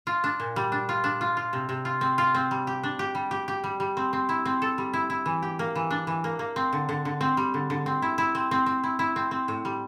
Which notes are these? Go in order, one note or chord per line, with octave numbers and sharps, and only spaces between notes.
F4
D4
A#2
G3
D4
F4
D4
F4
F4
C3
C3
F4
C4
F4
C4
G3
G4
D4
G4
G3
G4
G4
G3
G3
C4
C4
E4
C4
A4
G3
E4
E4
E3
G4
A#3
E3
D4
E3
A#3
A#3
C4
D3
D3
D3
C4
G3
D3
D3
C4
E4
E4
C4
C4
C4
E4
E4
C4
C4
A2
G3